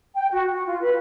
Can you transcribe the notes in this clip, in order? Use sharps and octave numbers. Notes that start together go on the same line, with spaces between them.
G5
F#4
F#4
F4
B4